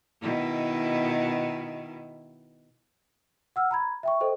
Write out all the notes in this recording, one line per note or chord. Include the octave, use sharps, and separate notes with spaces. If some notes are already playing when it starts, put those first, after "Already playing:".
B2 D#3 E4
F#5 E6 F6
A#5 B5 G#6
E5 G5 C#6
A4 C5 D#5 G5